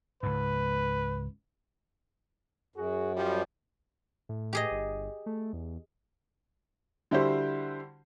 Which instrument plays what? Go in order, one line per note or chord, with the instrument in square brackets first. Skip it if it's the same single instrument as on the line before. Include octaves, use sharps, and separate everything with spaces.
[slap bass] C#2 G#2 [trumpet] B4
[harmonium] F#2 [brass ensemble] F#4 G#4
[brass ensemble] F3 G3
[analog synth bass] A2
[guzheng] G4 G#4 D#5
[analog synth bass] G1
A3
E2
[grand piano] D3 G3 E4 F#4 G4 C5